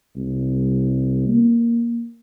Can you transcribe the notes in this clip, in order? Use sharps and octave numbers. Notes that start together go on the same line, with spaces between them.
C2
A#3